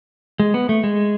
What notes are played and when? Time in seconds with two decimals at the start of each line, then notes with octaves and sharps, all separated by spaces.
0.40 G#3
0.54 B3
0.69 A3
0.84 G#3